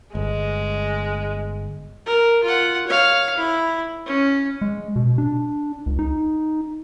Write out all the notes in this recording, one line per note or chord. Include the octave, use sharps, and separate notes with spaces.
G1 G#3
A#4
F4 F#5
C#5 F5
E4
C#4
G#3
B2
D4
C#2
D#4